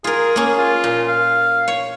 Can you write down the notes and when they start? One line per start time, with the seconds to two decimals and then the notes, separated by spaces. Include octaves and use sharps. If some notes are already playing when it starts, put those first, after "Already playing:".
0.04 F4 G#4 A#4
0.36 A#3 C#4
0.58 F4
0.84 A#2
1.08 F5
1.68 C#5